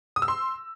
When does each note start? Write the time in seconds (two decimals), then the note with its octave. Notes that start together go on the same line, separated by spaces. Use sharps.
0.16 D#6
0.22 E6
0.28 C6